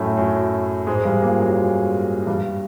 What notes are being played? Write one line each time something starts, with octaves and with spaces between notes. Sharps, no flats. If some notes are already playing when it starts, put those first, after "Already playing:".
Already playing: F#2 A2 F#3 A3
F#2 F#3
G#2 G#3
G2 G3
A#2 A#3
F#2 F#3
G2 G3